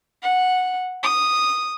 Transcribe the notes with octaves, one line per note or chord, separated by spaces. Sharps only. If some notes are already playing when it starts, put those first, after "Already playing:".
F#5
D#6